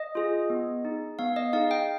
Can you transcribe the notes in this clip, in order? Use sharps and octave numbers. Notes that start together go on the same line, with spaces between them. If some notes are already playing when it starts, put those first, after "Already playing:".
Already playing: D#5
F4 G#4
B3
D#4 G#4
B3 F5
D#5
D#4 G#4 F5
G5